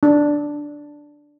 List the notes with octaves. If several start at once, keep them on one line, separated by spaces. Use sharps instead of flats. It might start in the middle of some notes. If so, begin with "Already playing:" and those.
D4